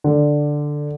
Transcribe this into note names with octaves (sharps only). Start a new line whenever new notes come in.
D3